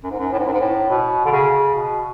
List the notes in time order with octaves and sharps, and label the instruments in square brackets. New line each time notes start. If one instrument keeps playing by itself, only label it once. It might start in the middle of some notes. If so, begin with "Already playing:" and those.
[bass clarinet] F#2
G#2
F#2
A2
G#2
F#2
G#2
A2
B2
D3
C#3
B2